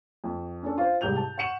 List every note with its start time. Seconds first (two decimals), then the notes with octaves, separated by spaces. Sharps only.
0.24 F2
0.63 C#4 D4 A4
0.78 F4 C5
1.01 C2 G#2 G4 G6 F7
1.16 A5
1.38 F#5 C#6 C#7 E7 F#7